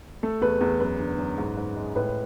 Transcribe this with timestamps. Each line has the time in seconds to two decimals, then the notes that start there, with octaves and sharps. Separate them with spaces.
0.23 A3 A4
0.41 E2 B4
0.61 E2 A4
0.80 F#2 B4
1.00 D3
1.19 F#2
1.38 G#2
1.57 G#2
1.76 G#3
1.96 A2 B4